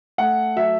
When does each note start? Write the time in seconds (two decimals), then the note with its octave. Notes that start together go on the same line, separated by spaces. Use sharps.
0.18 A3 F#5
0.56 F#3 E5